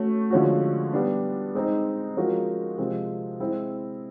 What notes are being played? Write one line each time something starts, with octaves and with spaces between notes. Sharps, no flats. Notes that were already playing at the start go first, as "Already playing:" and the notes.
Already playing: A3 C#4 F#4
D3 F3 G#3 C#4 F#4
G3 B3 D4
G#3 C4 D#4
F3 G#3 C#4 F#4 A#4
C3 F3 G#3 C4
G#3 C4 E4